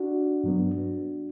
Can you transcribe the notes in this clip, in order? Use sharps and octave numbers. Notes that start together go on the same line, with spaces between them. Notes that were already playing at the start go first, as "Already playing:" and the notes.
Already playing: D4 F#4
G2 F#3 B3